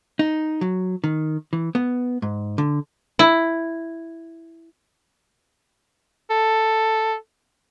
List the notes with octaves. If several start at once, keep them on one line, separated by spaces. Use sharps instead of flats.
D#4
F#3
D#3
E3
B3
G#2
D3
E4
A4